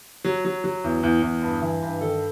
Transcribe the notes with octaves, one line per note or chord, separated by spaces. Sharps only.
F#3
F#3
F#3
E2
E2
E2
G2
E3
G2
D#3 A4